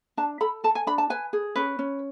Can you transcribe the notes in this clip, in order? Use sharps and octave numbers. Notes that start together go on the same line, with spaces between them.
D4 A5
A4 B5
A4 A5
G#5
D4 B5
A5
B4 G#5
G#4
C#4 B4
C#4